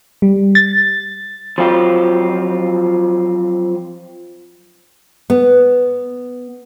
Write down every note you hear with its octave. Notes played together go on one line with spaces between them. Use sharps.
G3
A6
F3 F#3 C4 F4 G4
B3